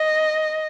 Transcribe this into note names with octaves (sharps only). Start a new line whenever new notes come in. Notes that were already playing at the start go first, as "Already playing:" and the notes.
Already playing: D#5